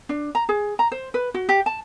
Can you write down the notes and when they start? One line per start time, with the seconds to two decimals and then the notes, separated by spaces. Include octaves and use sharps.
0.09 D4
0.35 A#5
0.49 G#4
0.79 A#5
0.92 C5
1.14 B4
1.34 F#4
1.49 G4
1.66 A5